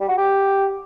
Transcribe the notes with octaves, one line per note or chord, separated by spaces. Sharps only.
G3
F#4
G4